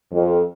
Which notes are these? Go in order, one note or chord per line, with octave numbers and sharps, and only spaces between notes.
F2